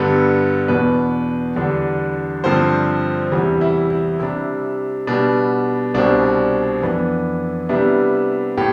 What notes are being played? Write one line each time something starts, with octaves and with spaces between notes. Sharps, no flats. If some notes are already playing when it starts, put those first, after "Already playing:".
Already playing: G2 D3 G3 B3 A4
E2 B2 B3 D4 B4
E2 D3 G3 D4
G2 D3 F3 C4 C5
E2 C3 E3 G3
E4
E4
C3 G3 D4 E4
B2 G3 B3 D4
C2 B2 G3 C4 D4
F2 E3 B3 D4
C3 G3 B3 D4 E4
A2 G4